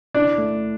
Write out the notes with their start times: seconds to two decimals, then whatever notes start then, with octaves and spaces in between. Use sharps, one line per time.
0.14 D4 E4
0.38 A3